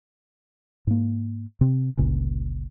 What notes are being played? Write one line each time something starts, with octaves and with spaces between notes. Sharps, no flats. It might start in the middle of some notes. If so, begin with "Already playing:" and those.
G#2 A#3
C3 C4
G1 C#2 A#2 C#3